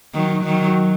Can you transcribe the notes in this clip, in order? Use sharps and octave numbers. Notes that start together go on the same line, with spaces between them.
D#3 F#3
D#3 F#3